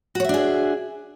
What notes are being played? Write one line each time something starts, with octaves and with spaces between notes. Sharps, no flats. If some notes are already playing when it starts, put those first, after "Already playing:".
D4 F#4 G#4 C#5 E5